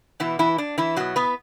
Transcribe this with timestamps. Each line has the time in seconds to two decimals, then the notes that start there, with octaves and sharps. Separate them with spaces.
0.20 B2 E3 B3 E4
0.39 E3 E4
0.58 D4
0.78 E3 E4
0.96 B2 F#3 B3 F#4
1.16 B3 B4